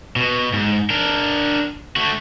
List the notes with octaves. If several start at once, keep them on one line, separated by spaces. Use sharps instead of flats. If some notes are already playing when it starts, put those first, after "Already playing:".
B2
G#2
D4 A#4
A3 F#4